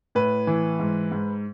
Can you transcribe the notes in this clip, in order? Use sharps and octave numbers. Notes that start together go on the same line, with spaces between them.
A2 B4
E3
G#2
G#2